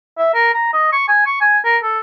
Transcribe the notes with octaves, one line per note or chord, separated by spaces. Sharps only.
E5
A#4
A#5
D#5
C#6
G#5
C#6
G#5
A#4
A4